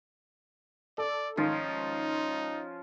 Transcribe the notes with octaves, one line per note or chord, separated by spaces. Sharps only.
A4 D5
G#2 D#3 F3 C#4 D#4 F4